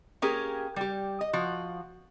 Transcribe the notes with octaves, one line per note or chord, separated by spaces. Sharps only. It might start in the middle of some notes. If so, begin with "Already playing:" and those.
A#3 C#4 G4 G#4 A#4
G3 G4
D#5
F3 F#4